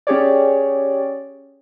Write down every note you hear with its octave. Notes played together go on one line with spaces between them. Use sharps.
C#4 G4 G#4 C#5 D5